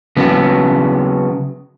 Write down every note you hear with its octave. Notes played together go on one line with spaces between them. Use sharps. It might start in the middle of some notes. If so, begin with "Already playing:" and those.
C#3 F#3 B3